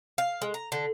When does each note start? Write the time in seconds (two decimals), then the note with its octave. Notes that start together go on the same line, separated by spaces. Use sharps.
0.18 F5
0.42 G#3
0.54 A#5
0.72 D3